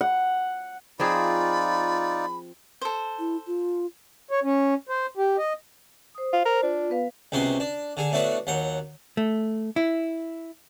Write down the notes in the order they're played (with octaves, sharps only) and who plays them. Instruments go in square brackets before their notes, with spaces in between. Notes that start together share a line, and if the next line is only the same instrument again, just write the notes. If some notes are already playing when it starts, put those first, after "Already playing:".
[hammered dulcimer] F#5
[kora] F3 C4 G#4 [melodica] D#4 F4 D5 [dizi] B5
[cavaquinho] A4 C5
[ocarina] E4
F4
[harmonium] C#5
C#4
C5
G4
D#5
[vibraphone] C5 D#6
[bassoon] F4 [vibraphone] C5
[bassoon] A#4
[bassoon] D4 [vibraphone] F4
[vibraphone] B3 B4 F5
[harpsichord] C#2 C3 B3 F#4 C6
D4
D3 G#4
A2 A3 B3 D4 F#4
D#2 F#3 F#5
[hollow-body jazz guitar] A3
E4